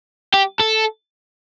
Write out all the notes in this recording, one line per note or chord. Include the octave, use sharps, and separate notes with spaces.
G4
A4